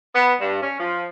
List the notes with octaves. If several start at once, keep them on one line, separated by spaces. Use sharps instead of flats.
B3
G2
C#4
F3